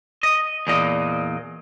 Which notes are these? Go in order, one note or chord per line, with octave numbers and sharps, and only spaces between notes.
D#5
E2 A#2 D#5